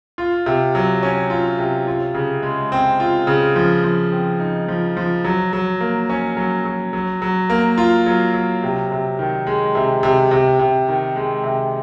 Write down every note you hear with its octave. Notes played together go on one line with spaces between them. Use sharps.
F4
C3
F#3
C#4
F4
C3
F4
C#3
G#3
C4
F4
C#3
F3
F3
C4
D#4
F3
F3
F#3
F#3
A#3
C#4
F#3
F#3
F#3
F#3
A#3
F4
F#3
F#3
C3
C3
D#3
G#3
C3
C3
C3
C3
D#3
G#3
C3